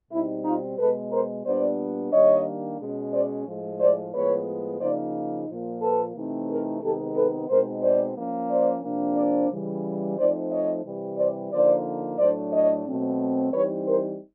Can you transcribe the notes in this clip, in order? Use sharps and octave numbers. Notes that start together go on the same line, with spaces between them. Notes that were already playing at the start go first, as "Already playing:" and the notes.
B2 G3 C4 D#4 E4
D#4 F4
B2 G#3 B3 A4 B4
A#4 C5
A#2 G3 B3 D4 C5 D5
D#3 G3 A#3 D4 C#5 D#5
B2 G#3 C#4
C5 D5
A2 F3 G#3
C5 D5
A2 F3 G#3 B3 B4 C#5
C#3 F3 A#3 D#4 C5 D5
A#2 F3 A#3
A4 B4
C3 E3 A3 C4 D#4
G#4 A#4
C3 D#3 G#3 B3 D#4 G4 A4
A4 B4
B2 G#3 C4 D#4 A#4 C5
C5 D5
F3 A#3 C#4
C5 D5
C3 F3 A#3 D4
C5 D5
C#3 E3 G3
F3 A3 C4 D#4 C5 D5
C#5 D#5
C3 E3 G3
C5 D5
D3 F3 A#3 D#4 C5 D5
A2 F#3 A3 D4 C5 D5
C#5 D#5
B2 F#3 A3 C4
E3 G3 C4 D#4 B4 C#5
A#4 C5